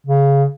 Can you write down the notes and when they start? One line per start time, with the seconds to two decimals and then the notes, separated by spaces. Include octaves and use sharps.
0.07 C#3